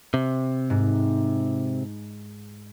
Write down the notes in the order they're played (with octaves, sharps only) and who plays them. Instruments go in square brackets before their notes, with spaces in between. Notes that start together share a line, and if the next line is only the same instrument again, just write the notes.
[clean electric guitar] C3
[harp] G#2